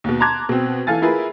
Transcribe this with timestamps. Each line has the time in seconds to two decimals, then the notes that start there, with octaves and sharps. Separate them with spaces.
0.04 D#2 B2
0.20 A5 A#5 C6 D6 F#6 G#6
0.49 B2 C4
0.87 E3 A4 F5 G#5 A6
1.02 E4 F4 G#4 A#4 B4